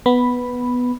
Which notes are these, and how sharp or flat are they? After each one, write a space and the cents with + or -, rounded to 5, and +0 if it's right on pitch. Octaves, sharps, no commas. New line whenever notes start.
B3 +0 B5 +0